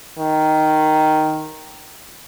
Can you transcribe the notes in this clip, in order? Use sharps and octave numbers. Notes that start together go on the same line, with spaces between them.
D#3